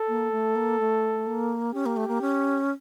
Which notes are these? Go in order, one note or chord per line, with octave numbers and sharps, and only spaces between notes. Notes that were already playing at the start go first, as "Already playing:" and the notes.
Already playing: A4
A#3
A3
A#3
A3
A#3
C#4 G4
A#3
A3
A#3
C#4